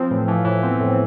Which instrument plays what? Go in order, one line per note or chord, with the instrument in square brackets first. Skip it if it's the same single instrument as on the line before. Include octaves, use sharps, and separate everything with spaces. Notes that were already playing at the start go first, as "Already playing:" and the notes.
Already playing: [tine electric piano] F3 [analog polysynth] C4
[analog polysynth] A2 [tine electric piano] E3
[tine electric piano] E3 [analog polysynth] F3
[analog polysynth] A2 [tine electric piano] E3
[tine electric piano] B3 [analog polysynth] C4
[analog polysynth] A2 [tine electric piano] A3